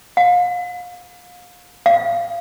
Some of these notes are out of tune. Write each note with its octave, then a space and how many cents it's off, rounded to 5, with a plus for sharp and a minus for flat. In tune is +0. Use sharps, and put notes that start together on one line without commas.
F5 +35
F5 -30